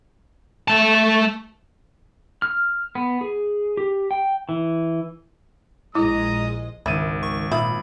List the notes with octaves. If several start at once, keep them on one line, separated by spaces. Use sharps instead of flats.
A3 A5
F6
B3
G#4
G4
G5
E3
A#1 G#3 E4 D#5 A#5 D#6
G#1 C#2 D#3 E4 D#7
C#6
A#2 D#4 F4 E5 B5